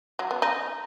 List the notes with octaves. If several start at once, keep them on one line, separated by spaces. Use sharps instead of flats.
F#3
B3
D#4